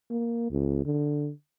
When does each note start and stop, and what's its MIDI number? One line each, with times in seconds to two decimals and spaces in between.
0.10 0.47 58
0.51 0.84 37
0.85 1.31 50